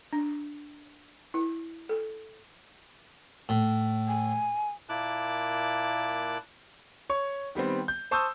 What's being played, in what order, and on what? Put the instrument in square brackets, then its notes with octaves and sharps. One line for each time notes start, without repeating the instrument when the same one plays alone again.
[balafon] D4
E4
A4
[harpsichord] A2
[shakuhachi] G#5
[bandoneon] A#2 A#3 E4 A5 D6 F#6
[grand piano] C#5 C#6
D#3 G3 B3 C4
G6
C5 A5 C#6 D#6 E6 G6